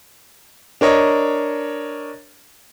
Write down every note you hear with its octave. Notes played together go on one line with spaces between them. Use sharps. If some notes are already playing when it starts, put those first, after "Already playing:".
D4 A#4 C#5 D#5